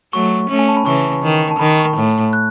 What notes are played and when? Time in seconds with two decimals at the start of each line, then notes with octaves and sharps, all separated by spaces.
0.13 F#3 A3 C#6
0.49 A3 C#4
0.59 G#5
0.68 A5
0.77 B5
0.86 C#3 E3 C#6
1.23 D#3
1.51 A5
1.59 D#3 B5
1.78 C#6
1.96 A2
2.33 F#6